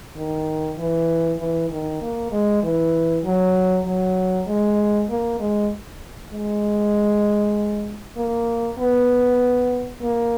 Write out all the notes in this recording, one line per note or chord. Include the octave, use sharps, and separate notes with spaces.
D#3
E3
E3
D#3
A#3
G#3
E3
F#3
F#3
G#3
A#3
G#3
G#3
A#3
B3
A#3